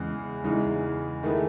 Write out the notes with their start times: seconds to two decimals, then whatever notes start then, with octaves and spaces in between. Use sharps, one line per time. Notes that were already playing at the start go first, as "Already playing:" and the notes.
Already playing: E2 C#3 G#3
0.44 E2 C#3 E3 G#3 D#4
1.23 D#3 A3 E4 G#4 B4